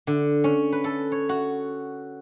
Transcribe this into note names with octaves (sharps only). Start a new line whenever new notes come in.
D3
C#4
B4
A4
C#5
F#4